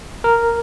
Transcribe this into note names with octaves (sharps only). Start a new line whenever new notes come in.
A#4